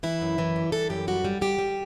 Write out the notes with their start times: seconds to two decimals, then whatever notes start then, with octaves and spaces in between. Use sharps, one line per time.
0.03 E3 E4
0.21 F#2
0.38 E3
0.56 G3
0.72 E3 A4
0.90 F#2 G4
1.08 G3 F#4
1.25 G3
1.41 G3 G4
1.59 G3